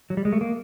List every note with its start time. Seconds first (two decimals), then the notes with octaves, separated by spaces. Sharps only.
0.10 F#3
0.17 G3
0.25 G#3
0.33 A3
0.41 A#3